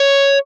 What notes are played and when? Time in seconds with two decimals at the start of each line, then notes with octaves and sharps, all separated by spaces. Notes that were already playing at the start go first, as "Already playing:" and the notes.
Already playing: C#5